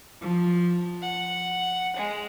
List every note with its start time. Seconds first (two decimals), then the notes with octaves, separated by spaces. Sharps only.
0.21 F3
1.03 F#5
1.96 G#3